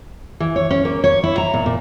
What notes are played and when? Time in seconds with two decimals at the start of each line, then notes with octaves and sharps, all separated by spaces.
0.40 E3
0.56 C#5
0.71 C#4
0.85 A#3
1.04 C#5
1.24 E4
1.38 A#5
1.54 A#2
1.66 A#2